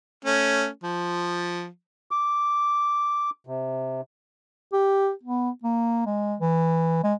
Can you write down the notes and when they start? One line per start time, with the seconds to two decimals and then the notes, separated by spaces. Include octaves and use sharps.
0.25 A3 C#4
0.84 F3
2.11 D6
3.47 C3
4.73 G4
5.23 B3
5.64 A#3
6.06 G#3
6.40 E3
7.04 G#3